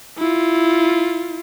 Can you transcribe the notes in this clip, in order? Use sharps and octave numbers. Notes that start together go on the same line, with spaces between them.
E4 F4